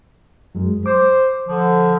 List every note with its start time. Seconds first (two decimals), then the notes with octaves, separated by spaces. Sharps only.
0.55 F#2 F#3 G#3
0.86 C5 D6
1.47 D3 F3